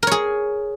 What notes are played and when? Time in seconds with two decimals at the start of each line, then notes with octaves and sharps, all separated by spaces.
0.03 A#4
0.07 C#5
0.11 G#4